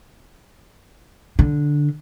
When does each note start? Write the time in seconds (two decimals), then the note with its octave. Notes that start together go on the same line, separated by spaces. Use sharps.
1.39 D3